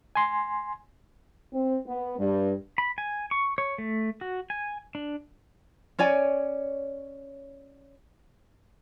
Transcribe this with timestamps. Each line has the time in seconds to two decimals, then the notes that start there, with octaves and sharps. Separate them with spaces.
0.15 G#5 C6
1.53 C4
1.86 B3
2.19 G2
2.78 B5
2.98 G#5
3.31 C#6
3.58 C#5
3.78 A3
4.21 F#4
4.50 G#5
4.95 D4
5.99 C#4 C#5 D5 G#5